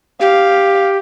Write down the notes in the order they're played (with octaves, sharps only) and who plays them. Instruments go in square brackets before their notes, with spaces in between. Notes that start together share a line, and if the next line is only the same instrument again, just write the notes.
[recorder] G4 [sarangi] F5